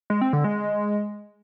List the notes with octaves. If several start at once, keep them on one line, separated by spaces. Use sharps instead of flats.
G#3
C4
D3
G#3